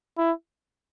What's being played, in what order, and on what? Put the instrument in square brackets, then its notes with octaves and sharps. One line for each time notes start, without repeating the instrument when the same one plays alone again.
[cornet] E4